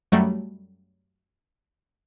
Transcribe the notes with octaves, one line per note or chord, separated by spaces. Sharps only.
F#2 F#3 G3 A3